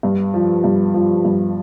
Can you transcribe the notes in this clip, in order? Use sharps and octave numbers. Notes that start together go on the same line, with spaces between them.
G2
F3
G2
F3
G2